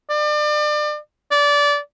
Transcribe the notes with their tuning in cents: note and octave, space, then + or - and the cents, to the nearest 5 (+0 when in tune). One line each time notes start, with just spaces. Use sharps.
D5 +35
D5 -20